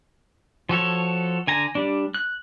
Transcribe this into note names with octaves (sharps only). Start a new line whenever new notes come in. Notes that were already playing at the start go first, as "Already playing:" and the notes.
F3 F#4 A4 C#5
D3 G#5 A#5
G3 D4
F#6